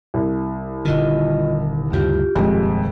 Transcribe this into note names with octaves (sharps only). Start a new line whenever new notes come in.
C2
D#1 D3 D#3 F4 D#5
D2 G2 C#3 F4 G4
D#1 F2 G#3